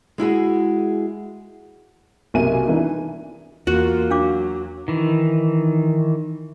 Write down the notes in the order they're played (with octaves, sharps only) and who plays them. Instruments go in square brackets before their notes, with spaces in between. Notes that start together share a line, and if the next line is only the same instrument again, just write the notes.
[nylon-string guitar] G#3 E4 F#4 G#4
[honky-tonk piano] B1 C3 A#3 E5 G#5 D#7
E3 D4 D#4
[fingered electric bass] E2 [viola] A#3 F4 [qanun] F#4
[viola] F#3 [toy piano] D4 F5 D6
[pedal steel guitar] D#3 E3